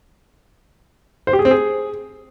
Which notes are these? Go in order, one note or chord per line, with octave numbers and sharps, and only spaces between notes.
C5
G4
G#4
C4
G#4